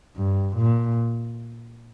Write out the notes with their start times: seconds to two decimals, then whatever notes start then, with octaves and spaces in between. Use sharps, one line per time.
0.17 G2
0.56 A#2